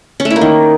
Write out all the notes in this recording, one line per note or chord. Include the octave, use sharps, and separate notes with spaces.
C#4
A3
E4
A#3
D#3